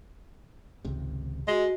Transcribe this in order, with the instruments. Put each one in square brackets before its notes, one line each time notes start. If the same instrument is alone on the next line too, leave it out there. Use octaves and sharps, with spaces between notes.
[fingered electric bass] G#1 C#2 C3
[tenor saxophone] G#3 [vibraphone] F#4 D#5